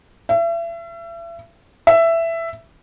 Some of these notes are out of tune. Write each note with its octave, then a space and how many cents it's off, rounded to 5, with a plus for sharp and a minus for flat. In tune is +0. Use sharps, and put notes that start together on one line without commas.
E5 +35
E5 +10